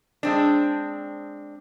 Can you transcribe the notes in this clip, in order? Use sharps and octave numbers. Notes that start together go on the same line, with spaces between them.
G#3 C4 D4